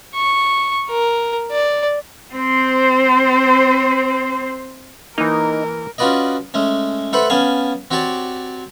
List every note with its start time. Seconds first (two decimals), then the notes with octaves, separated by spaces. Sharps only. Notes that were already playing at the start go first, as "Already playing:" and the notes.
0.15 C#6
0.89 A#4
1.51 D5
2.34 C4 C5
5.18 E3 A#3 D#4 A#4
5.98 C#4 F4 F#4 B4 D5 D#5
6.54 G#3 A3 C#4
7.13 A3 A4 B4 C5 F#5
7.30 B3 C#4 F5 G#5 A5
7.91 C4 F#4 G4 C#5 D5 A5